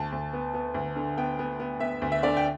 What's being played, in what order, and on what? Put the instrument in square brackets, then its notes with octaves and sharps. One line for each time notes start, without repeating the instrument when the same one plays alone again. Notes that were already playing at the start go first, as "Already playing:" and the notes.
Already playing: [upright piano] D2 A5
D2
B3
B3
D2
D3
B3 G5
B3
B3
B3 E5
D2
E5
D3 D5
G5